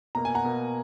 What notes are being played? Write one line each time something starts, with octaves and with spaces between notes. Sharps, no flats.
B2 A#3 A#5
G#5
F#5 A#5
B2 A#3